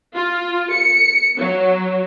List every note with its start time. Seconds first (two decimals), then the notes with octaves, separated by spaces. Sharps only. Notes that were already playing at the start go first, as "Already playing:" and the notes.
0.15 F4
0.73 C#7
1.39 F#3